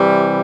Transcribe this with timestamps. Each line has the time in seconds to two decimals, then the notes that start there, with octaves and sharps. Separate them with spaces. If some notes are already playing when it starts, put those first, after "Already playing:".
Already playing: C3 E3 G3